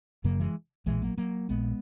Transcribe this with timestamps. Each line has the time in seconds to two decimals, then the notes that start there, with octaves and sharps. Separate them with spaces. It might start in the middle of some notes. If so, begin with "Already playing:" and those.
0.24 F#1 F#2 C#3 F#3 A#3
0.40 E3 G#3
0.86 A#1 A#2 E3 G#3
1.02 F#3 A#3
1.18 F#3 A#3
1.49 A#1 A#2 G#3 B3